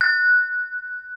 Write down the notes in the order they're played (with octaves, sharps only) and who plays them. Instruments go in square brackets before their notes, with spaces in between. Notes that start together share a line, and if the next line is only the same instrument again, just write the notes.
[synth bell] F#6